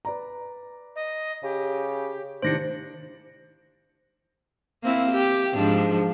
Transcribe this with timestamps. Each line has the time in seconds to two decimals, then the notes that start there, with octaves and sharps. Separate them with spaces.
0.05 B4 D5 A#5
0.96 D#5
1.43 C#3 G4
2.42 A2 C3 D#3 D4 C5 A#6 C#7
4.83 A#3 C4 E4
5.11 G4
5.55 G#2 F3 D4